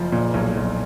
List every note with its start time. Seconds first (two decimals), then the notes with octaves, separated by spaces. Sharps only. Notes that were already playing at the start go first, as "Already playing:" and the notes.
Already playing: F#1 F3
0.12 A#2
0.34 B1
0.57 B1